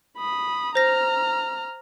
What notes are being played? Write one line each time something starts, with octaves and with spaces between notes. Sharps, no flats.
B5 D#6
C5 A#5 F6 A#6